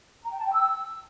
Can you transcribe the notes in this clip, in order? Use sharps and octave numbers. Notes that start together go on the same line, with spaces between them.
A#5
G5
A5
G5
E6